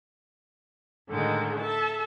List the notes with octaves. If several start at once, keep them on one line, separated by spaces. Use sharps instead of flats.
A2 D3 D#3 G#3
A4 E5 A5